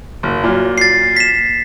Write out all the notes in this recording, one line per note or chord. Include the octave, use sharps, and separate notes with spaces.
F#1
A#2 F#3
A6 C7
B6 E7